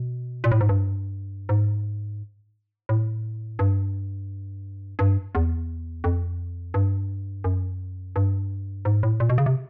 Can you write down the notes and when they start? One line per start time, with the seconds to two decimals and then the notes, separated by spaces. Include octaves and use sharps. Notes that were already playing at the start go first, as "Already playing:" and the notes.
Already playing: B2
0.44 A#2
0.51 A2
0.61 G#2
0.69 G2
1.49 G#2
2.89 A2
3.59 G2
4.99 G2
5.35 E2
6.04 F2
6.74 G2
7.44 F#2
8.16 G2
8.85 G#2
9.03 A2
9.20 A#2
9.30 B2
9.38 C#3
9.46 C3